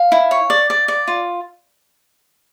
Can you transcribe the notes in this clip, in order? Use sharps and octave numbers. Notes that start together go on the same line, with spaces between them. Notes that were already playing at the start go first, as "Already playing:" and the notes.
Already playing: F5
E4
C#5
D5
D5
D5
F4